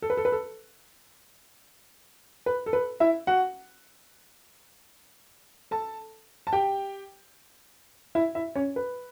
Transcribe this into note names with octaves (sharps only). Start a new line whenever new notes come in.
A4
B4
A4
B4
A4
B4
A4
B4
E4 E5
F#4 F#5
A4 A5
A5
G4 G5
E4 E5
E4 E5
C#4 C#5
B4